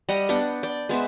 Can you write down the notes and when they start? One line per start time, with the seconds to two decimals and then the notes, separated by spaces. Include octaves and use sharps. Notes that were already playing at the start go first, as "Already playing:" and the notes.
0.09 G3 G4 D#5 F#5
0.29 B3 D4 F#5 G5
0.63 D5 G5
0.89 G#3 B3 C5 E5